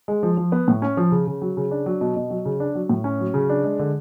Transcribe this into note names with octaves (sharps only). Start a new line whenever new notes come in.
G#3
F3
F3
B3
A2
C#4
F3
C#3
C#3
F#3
C#3
D4
F#3
B2
B2
F#3
C#3
D4
F#3
A2
C#4
F#3
C#3
D4
G#3
D3